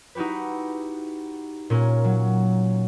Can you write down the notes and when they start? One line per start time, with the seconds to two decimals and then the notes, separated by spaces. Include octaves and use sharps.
0.15 D#4 E4 F#4 G4 B4
1.70 A#2 C#4 A#4
2.04 F#3